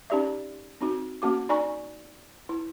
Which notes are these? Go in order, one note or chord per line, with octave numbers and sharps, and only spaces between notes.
C#4 D#4 G4 D5 E5
C4 D#4 F#4
A#3 C#4 F#4 D6
D#4 D5 G#5 A#5 C#6
E4